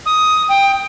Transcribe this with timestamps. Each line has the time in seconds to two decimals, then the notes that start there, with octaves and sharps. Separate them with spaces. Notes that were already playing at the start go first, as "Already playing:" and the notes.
0.06 D#6
0.49 G5